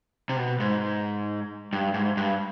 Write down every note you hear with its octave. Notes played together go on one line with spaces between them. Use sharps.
C3
B2
G#2
G2
G#2
G2